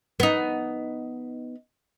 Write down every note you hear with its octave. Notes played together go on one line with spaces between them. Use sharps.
B3 D#4